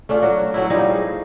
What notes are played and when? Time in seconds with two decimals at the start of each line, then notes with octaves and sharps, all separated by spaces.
0.09 A3 C#4 D4 F4
0.22 F#3 F#4
0.54 F#3 A3 E4
0.70 F3 G3 D#4 E4
0.90 G#4